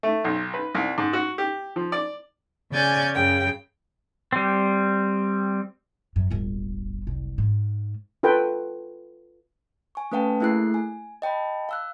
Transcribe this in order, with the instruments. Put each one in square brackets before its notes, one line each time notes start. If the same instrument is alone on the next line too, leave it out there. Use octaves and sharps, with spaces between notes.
[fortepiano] A3
B1
B4
C2
G#2
F#4
G4
F3
D5
[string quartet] C#3 C#4 D5 G#5 G6 A6
F#2 C#3 G5
[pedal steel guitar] G3 C4
[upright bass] F#2
D1 G1
F#1 C2
G#2
[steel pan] F4 A4 B4 G5
[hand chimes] G#5 C#6
A3 C#4 B4 F5 G5 A5
A3 A#3 E4 G#4 F#6 C7
G#5
D#5 G5 A5 B5
F5 E6 F#6